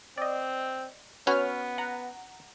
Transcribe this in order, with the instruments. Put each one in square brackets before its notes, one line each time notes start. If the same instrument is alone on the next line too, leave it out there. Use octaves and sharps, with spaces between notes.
[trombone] C4 [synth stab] D5 D#5
[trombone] B3 [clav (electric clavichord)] C#4 F#4 B4 [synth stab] C#5 F6
[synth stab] F#5 A#5